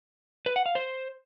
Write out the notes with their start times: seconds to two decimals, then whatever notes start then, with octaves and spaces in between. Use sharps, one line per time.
0.46 B4
0.56 F#5
0.66 F5
0.75 C5